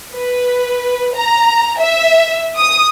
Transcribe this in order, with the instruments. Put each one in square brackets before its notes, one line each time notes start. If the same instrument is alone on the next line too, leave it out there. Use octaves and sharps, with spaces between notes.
[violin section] B4
A#5
E5
D#6